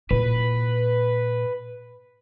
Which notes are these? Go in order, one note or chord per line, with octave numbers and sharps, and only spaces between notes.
A#2 E4 B4